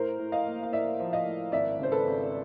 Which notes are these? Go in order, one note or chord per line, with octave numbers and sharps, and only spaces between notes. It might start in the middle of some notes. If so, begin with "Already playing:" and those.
Already playing: A2 A#4 C5
A2
D#5 F5
A#3
F5
A2 D5 E5
F3
D#5 F5
A2
G#1 D5 E5
C#3 C5
A4 B4
G#1